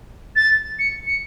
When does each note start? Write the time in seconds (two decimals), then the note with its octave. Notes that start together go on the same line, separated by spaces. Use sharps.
0.36 A6
0.79 C#7
1.07 C#7